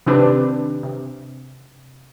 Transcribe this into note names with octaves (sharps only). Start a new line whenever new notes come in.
C3 D#3 C4 D4 G4 B4
C3